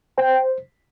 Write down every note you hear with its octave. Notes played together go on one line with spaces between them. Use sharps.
C5 G5